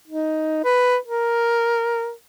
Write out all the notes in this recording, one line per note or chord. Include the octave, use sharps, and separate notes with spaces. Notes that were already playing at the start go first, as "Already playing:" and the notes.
D#4
B4
A#4